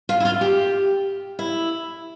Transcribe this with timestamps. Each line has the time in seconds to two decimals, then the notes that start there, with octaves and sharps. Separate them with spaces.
0.09 F4
0.20 E4
0.25 F4
0.41 G4
1.39 E4